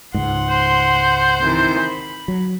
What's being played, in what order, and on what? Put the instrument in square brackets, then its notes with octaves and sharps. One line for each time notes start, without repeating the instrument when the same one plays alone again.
[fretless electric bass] C#2 G#2 [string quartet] F#5 C6
[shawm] C5
[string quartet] C3 D#3 E3
B5
[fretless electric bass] F#3